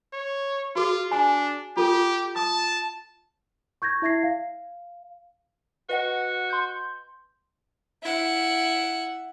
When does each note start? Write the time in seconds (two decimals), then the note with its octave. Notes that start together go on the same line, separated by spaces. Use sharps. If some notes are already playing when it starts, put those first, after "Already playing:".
0.13 C#5
0.76 F4 F#4 G#4
1.12 D4 G#5
1.77 F4 G4 A4
2.36 A5 D#6
3.82 C#6 G6 G#6 A#6
4.02 E4 E5 G#6 A#6 C7
4.23 F5
5.89 F#4 B4 D#5 F#5
6.50 C6 G6
8.03 E4 F#5